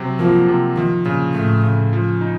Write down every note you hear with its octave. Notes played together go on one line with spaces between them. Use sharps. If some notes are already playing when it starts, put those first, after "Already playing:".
Already playing: C3 F#3
F3 A#3
C3
D#3 F3
A#2 C#3
A2 A3
C#3
F3
D#4